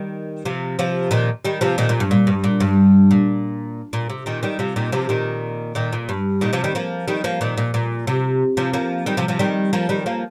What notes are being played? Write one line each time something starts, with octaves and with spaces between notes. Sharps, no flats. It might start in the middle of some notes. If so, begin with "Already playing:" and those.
Already playing: D#3 G3
C3 F3
C3 F3
A#2 D#3
D#3 G3
C3 F3
A#2 D#3
A#2
G2
A#2
G2
A#2
G2
A#2
A#2
C3
A#2 D#3
D#3 G3
C3 F3
A#2 D#3
C3 F3
A#2 D#3
A#2 D#3
A#2
G2
A#2 D#3
C3 F3
D#3 G3
F3 A#3
D#3 G3
F3 A#3
A#2 D#3
A#2
A#2
C3
C3 F3
F3 A#3
D#3 G3
C3 F3
C3 F3
D#3 G3
F3 A#3
D#3 G3
F3 A#3